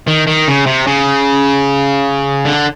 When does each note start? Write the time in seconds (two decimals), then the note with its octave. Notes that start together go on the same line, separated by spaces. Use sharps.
0.08 D#3
0.27 D#3
0.48 C#3
0.67 C3
0.87 C#3
2.46 D3